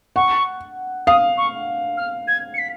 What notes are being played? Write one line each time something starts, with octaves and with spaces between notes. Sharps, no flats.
F#5 C#6
F5 D#6
C#6
F6
G#6
C#7
B6